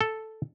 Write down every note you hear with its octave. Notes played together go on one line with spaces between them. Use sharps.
A4